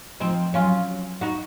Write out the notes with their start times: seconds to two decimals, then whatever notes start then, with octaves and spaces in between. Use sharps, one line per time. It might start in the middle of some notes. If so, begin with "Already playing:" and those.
0.20 F3 C4 D#4
0.54 F#3 C#4 F4
1.21 D#4 F#4